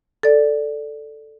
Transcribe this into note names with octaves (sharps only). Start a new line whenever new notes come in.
A4 D5